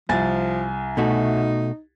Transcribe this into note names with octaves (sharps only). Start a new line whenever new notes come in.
C2 F3 G#5 A6
B2 A3 D#4 F#4